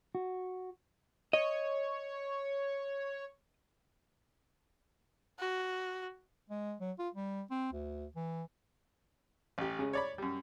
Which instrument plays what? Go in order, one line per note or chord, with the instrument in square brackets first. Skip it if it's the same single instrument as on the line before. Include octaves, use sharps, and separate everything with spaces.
[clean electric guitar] F#4
[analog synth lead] C#5 [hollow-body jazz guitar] D#5
[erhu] F#4
[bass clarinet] G#3
F#3
F4
G3
C4
D2
E3
[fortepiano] A1 G4
C#3 G#3 C#4
C#5 D5 B5
F#2 G3